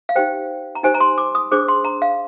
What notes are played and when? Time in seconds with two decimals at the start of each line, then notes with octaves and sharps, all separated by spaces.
0.09 F5
0.16 D#4 G4 C5 G5
0.75 A#5
0.83 D#4 G4 C5 G#5
0.94 A#5
1.00 C6
1.18 D6
1.35 D#6
1.51 D4 G#4 C5 D6
1.68 C6
1.84 A#5
2.02 F5